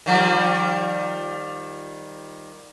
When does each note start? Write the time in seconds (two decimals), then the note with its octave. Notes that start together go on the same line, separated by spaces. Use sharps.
0.06 D#3 F3 G3